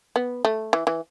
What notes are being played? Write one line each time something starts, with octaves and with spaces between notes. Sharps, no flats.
B3
A3
E3
E3